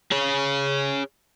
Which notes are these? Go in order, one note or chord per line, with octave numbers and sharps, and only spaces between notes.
G#4 C#5